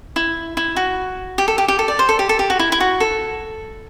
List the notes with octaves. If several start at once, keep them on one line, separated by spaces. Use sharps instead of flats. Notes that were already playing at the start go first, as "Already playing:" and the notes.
E4
E4
F#4
G4
A4
G4
G4
A4
D5
C5
A4
G4
A4
G4
F#4
E4
E4
F#4
A4